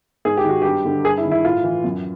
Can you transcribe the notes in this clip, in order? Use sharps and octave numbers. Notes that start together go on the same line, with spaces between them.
G#2 G#4
G4
D#3 F#4
G2 G4
D3
G2 G#4
E4
D#3
E4
A2 F4
E3
F#2